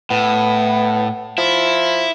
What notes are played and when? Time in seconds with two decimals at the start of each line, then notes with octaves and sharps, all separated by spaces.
0.10 A2 B3
1.38 F3 E4